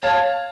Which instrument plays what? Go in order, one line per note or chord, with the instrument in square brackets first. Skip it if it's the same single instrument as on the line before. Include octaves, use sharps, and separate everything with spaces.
[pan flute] C#5 [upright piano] F5 A5